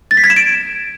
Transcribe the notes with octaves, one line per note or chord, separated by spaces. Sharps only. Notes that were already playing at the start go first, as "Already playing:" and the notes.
A6
B6
G#6
E7
D7